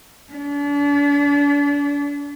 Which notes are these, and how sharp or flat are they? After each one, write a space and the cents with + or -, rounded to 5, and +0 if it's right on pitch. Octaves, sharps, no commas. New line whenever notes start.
D4 -40